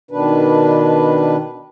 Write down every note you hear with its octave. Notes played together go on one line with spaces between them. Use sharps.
B2 D#3 D4 B4